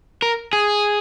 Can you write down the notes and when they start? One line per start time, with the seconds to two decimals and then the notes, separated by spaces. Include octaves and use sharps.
0.22 A#4
0.53 G#4